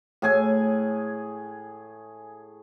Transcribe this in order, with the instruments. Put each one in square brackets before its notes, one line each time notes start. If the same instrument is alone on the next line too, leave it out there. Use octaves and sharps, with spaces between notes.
[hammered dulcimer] A2 G#4 G#5